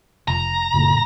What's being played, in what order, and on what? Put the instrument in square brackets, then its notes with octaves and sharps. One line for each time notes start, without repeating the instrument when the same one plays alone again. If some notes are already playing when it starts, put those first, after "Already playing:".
[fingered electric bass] F1 [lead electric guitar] A#5
[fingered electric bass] F#1 A2